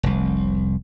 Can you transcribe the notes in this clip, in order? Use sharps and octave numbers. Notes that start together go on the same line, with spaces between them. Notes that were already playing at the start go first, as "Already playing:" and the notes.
F1 C2